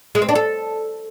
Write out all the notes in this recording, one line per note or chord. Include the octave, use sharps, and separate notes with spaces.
G#3
C4
D4
A4